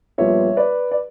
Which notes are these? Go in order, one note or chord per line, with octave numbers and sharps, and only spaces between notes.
A#1 A#2 G3 B3 C#5 E5
B4 D5
D5